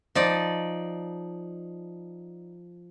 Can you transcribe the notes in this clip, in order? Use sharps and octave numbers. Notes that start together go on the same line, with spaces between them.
F3 D#4 D5